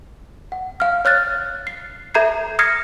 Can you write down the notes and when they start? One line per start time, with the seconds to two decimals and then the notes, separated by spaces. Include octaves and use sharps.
0.52 F#5
0.80 F5 F6
1.05 C#5 F6 F#6 A6
1.67 C7
2.14 A4 E5 A#5 G6 G#6 C7
2.59 D#6 F6 G#6 A#6 C7 C#7